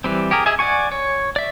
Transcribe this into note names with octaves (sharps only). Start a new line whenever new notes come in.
E3 G3 C4
G4 G#4 A#4
G#4 D#5 E5 G#5
D5 F#5 G#5 C#6
C#5
D5 E5